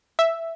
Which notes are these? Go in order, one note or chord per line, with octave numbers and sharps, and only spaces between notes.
E5